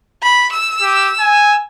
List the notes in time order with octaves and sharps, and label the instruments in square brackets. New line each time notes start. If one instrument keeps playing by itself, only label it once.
[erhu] B5
E6
[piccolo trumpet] G4
G#5